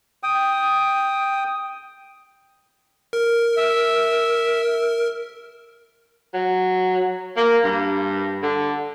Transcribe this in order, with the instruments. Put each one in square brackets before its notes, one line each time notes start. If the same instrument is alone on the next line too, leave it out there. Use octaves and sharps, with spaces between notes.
[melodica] G5 D#6
[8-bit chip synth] A#4
[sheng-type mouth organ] E5
[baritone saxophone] F#3
A#3
G2
D3